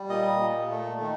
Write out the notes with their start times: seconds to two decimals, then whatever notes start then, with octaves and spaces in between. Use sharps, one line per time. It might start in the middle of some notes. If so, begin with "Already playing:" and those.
Already playing: G3
0.09 A#2 D#5
0.39 A#2
0.70 A3
1.00 D#3